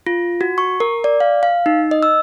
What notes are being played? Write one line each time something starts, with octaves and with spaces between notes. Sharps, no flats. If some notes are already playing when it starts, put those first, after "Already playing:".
F4
F#4
C#6
A#4
D5
F5
F5
D#4
D#5
E6